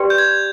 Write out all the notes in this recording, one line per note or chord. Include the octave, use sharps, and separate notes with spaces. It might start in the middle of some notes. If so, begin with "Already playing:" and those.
Already playing: G4 B4 D5 G5 C6
G6
G#6